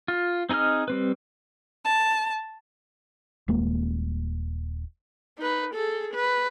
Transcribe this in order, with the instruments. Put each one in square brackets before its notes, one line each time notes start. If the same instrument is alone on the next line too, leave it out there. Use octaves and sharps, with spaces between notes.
[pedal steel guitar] F4
C4 D#4 G#4 D#5 F6
G3 C4 B4
[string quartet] A5
[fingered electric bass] D#1 G#3 A#3
[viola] D#4 B4
G#4 A4
B4